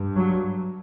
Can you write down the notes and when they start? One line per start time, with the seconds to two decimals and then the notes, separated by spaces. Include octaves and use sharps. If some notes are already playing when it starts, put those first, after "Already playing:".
Already playing: G2
0.16 F#3